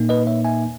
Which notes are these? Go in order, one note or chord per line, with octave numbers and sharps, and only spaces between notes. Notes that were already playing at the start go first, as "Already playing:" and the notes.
Already playing: A#2 A#3 D#4
B4 D#5
C#5 E5
E5 G#5